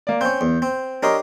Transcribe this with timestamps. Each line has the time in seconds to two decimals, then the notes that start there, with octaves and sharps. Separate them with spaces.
0.07 A#3 D5
0.21 C4 C#4 G6
0.41 E2
0.62 C4
1.03 D4 G4 A#4 C#5 D#5 C6